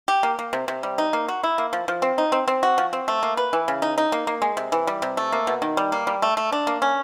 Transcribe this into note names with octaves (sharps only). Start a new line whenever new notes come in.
G4
A#3
A#3
C3
C3
G3
D#4
A#3
F#4
E4
A#3
F3
F3
C4
D#4
C4
C4
F#4
F3
C4
A3
A#3
B4
E3
C#3
D#4
D#4
A#3
A#3
G#3
C3
E3
G3
C3
A3
A#3
B2
D#3
G3
A#3
G3
A3
A3
D4
A#3
C#4